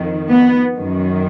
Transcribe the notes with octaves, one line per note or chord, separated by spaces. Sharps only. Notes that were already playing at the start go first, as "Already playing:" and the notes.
Already playing: F2 D#3
B3
F#2 D#3